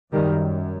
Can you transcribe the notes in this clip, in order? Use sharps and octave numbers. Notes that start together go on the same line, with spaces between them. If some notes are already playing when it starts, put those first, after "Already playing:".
F#2 D#3 G3